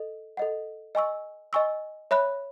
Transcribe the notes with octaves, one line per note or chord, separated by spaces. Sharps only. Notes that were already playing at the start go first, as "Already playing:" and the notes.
Already playing: A4 D#5
A4 D#5 F#5
D#5 G#5 C#6 E6
D#5 G#5 C#6 E6
C#5 E5 B5 F#6